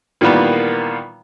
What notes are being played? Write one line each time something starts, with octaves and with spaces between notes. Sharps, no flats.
A#2 D#3 E3 G3 A#3 B3